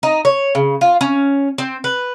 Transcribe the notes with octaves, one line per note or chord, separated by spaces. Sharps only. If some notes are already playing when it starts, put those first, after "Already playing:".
D#4
C#5
C#3
F4
C#4
C4
B4